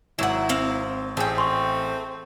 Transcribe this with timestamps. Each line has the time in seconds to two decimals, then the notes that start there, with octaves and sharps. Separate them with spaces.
0.19 G#1 F#3 E4 F#5 E6 E7
0.49 C4 F5
1.17 A1 A3 C4 G#4 G5 G6
1.38 C6 C#6